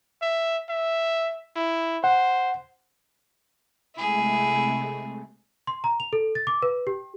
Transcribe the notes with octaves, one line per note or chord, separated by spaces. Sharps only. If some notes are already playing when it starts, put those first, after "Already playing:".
E5
E5
E4
C5 F#5
C3 G#3 A3 E4 G#4
C6
A#5
F7
A4
A6
D6
B4
G4